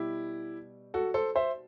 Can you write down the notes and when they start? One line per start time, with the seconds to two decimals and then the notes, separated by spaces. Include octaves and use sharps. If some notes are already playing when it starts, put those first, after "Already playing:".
Already playing: B2 G3 E4 G4
0.94 F#4 A4
1.14 A4 C5
1.36 C5 E5